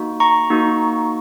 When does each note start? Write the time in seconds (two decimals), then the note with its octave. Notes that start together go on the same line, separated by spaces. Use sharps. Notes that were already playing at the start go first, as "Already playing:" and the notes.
Already playing: A#3 D#4 F#4
0.20 A#5 C#6
0.50 A#3 D#4 F#4